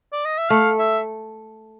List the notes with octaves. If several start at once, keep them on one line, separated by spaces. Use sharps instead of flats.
D5
D#5
E5
A3 F5
E5